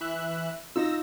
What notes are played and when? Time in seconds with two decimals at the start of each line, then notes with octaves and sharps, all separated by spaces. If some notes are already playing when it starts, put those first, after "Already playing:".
0.01 E3 E5 F#6
0.76 D#4 F4 E6 A#6